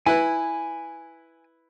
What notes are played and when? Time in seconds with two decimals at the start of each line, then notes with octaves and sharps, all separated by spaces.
0.06 E4 B4 G#5